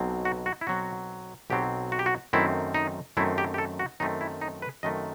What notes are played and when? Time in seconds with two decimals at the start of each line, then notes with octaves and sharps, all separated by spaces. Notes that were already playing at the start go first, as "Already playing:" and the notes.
Already playing: B1 B2 F#3 C4
0.25 F#4
0.46 F#4
0.61 E4
0.67 B1 B2 F#3 C4 F#4
1.50 B1 B2 F#3 C4 G4
1.92 F#4
1.99 G4
2.06 F#4
2.33 F#2 D#3 A3 C4 E4
2.74 D#4
3.17 F#2 D#3 A3 C4 E4
3.38 G4
3.54 G4
3.58 A4
3.79 F#4
4.00 F#2 D#3 A3 C4 D#4
4.21 E4
4.41 D#4
4.62 B4
4.83 F#2 D#3 A3 C4 D#5